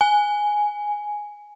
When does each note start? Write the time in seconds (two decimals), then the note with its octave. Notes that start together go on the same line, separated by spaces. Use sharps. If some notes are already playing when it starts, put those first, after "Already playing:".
0.01 G#5